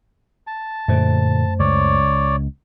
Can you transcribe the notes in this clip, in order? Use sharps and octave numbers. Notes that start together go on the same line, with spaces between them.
A5
F#2 A#2 D3 A3 C5
C#2 C#5 D5